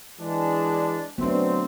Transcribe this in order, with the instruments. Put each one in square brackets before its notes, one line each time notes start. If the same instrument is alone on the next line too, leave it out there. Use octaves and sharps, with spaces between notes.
[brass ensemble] E3 G#3 D4
[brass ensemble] F#3 A3 C4 [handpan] B3 D4